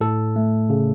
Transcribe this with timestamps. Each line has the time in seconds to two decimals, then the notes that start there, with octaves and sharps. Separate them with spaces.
0.01 A2 A4
0.36 A3
0.70 C#3